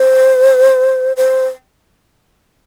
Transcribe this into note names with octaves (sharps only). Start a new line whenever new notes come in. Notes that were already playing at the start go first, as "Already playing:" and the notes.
Already playing: C5
C5